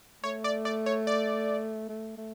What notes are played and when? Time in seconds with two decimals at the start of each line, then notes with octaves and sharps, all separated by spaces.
0.23 A3 C#5
0.44 D5
0.65 D5
0.86 C#5
1.07 D5
1.89 A3
2.17 A3